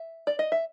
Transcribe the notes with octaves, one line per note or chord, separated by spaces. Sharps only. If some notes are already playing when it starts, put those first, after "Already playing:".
Already playing: E5
D5
D#5
E5